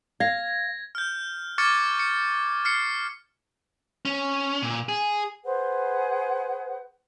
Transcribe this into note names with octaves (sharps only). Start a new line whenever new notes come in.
F5 G#6 A#6
F6 G6
C#6 D6 F6 G#6 A6 C#7
C#7
F6 C7 C#7
C#4
A#2
G#4
G#4 B4 C5 F#5